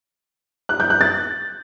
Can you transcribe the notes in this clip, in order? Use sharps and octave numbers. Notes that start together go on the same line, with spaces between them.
F#6
G6
F#6
A6